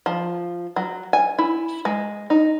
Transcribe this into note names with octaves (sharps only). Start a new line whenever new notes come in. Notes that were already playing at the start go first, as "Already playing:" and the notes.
F3
F#3
G#5
E4
G#3
D#4